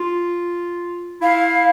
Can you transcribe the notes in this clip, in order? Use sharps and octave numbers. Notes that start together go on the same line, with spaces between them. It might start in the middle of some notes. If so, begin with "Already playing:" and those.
Already playing: F4
E4 F5